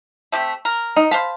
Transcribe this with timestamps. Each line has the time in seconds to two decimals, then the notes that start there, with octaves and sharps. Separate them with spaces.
0.32 A3 C4 G4
0.65 A#4
0.96 D#4
1.11 C5 F5 A5 B5